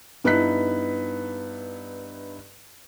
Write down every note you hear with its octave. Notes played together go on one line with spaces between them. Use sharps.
G2 B3 D#4 E4 F#6 B6